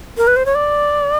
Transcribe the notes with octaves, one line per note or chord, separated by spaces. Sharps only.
A#4
B4
C5
C#5
D5